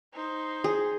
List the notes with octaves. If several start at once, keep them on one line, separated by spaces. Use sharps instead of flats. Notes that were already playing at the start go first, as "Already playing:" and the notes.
D#4 C5
G#4